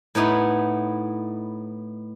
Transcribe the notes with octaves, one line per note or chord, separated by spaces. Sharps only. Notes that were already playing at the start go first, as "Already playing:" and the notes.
A2 B3 D#4 E4 B5